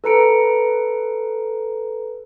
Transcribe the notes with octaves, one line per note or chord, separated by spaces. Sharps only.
A4 B4 A#5 C#7 D7